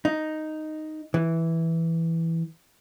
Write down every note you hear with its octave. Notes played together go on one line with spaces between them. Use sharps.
D#4
E3